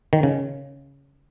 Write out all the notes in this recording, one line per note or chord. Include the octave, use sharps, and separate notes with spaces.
D#3
C#3